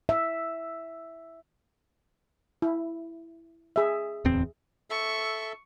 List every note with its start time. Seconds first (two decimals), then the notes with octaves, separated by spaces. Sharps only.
0.09 E5
2.62 E4
3.76 G#4 E5
4.25 D1 E2 C4
4.90 A4 E5 C#6